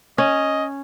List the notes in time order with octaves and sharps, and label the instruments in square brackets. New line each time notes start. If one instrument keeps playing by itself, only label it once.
[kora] C#4 [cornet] D#5